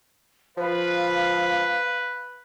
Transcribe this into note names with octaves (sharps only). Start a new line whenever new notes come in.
F3 B4 F5